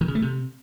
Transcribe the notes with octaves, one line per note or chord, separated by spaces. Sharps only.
D#3
C#3
A3
C3